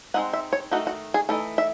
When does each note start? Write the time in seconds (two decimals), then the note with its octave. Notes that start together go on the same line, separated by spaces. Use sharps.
0.14 G#3 C4 D#4 F#5
0.33 E5
0.53 C#5
0.71 D#3 A3 D#4 F#4
0.87 F#4
1.14 G#4
1.29 E3 A3 D#4 A4
1.58 E5